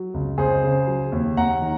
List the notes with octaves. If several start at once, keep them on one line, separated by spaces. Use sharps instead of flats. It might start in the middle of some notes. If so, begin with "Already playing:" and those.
Already playing: F#3
C#2
C#2 G#4 C5
C#3
F#3
D#2
D#2 F#5 A#5
D#3